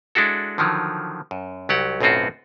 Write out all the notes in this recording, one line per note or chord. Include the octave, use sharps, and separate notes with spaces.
G#3 D4 E4 F#4 A4
D3 D#3 F3 F#3
F#2
C2 F#3 G4 F#5
B1 F#2 A2 C4 F4 F#4